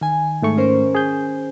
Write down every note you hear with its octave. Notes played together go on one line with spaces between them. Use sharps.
D#3 G#5
G#2 A3 C#6
C#4 A#4 C5
G#4 G6